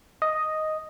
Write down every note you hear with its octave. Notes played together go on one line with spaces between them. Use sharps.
D#5